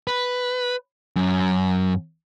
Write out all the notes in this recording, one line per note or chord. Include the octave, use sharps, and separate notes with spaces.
B4
F#2